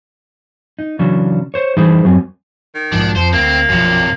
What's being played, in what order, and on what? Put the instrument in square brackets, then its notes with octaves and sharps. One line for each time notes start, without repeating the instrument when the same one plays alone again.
[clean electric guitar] D#4
C#3 E3 F#3 C#4 D4
C5 C#5
E3 G3 D#4 E4 G#4 C5
F#2 F#3 C4 G#5
[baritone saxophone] D#3
[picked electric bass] B1 G#2 F3 [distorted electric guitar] D4
[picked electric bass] F2 [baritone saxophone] F3 [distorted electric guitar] C5
[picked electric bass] D2 [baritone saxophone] A#3 [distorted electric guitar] C4
[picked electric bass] B1 F3 [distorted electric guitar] F#2 C3